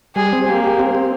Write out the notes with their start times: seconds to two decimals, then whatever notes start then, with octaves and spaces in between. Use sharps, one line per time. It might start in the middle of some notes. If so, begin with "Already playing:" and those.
0.15 G3 G#4
0.32 C4
0.48 A#3 G4
0.64 G4
0.79 C4
0.95 C4